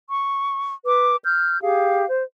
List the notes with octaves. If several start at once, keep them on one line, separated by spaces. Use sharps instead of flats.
C#6
B4 D6
F6 G6
G4 G#4 F5
C5